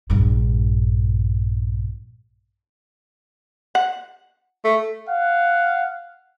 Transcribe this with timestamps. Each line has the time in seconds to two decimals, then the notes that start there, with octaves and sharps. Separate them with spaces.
0.10 A#1 G2
3.75 F#5
4.64 A3
5.08 F5 F#5